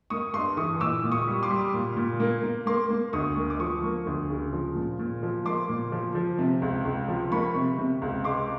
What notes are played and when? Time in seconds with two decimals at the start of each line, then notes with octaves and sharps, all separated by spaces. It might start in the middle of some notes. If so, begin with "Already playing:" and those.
0.10 A#3 C#6 D#6
0.34 G2 C6 D6
0.57 E3 C#6 D#6
0.80 A#2 D6 E6
1.04 A#2
1.12 C#6 D#6
1.27 G3
1.43 C6 D6
1.50 G3
1.74 A#2
1.97 A#2
2.20 A#3
2.43 A#3
2.66 A#3 C6 D6
2.90 A#3
3.13 D2 C#6 D#6
3.36 A#3
3.50 D6
3.60 F3 C#6 D#6
3.83 A#3
4.06 D2
4.30 C#3
4.53 F3
4.76 A#2
4.99 A#2
5.23 F3
5.46 A#3 C6 D6
5.69 A#2
5.92 F3
6.15 F3
6.39 C3
6.62 C#2
6.85 C#2
7.08 F3
7.32 A#3 B5 C#6
7.55 C3
7.78 C3
8.02 C#2
8.24 G#3 C6 D6